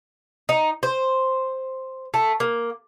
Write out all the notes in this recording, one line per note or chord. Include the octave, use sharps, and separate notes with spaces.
D#4
C5
A3
A#3